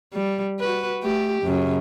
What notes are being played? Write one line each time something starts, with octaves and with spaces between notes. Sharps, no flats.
G3
F#4 B4
A3 G4
F#2 C#3